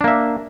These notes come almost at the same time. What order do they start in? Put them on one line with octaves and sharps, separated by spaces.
D4 A#3 E5